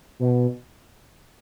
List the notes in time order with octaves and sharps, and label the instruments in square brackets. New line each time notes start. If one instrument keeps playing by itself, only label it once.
[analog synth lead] B2